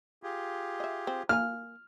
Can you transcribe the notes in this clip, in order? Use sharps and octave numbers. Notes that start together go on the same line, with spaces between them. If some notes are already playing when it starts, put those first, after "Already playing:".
F4 G4 G#4
D#5 E5
C4
A#3 F5 G#5 F6